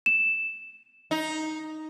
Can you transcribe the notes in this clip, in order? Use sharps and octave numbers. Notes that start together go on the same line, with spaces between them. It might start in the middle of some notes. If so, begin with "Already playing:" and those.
E7
D#4